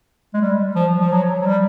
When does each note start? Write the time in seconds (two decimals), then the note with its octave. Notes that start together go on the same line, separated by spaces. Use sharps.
0.33 G#3
0.41 G3
0.75 F3
1.00 F3
1.12 F#3
1.41 F#3
1.46 G3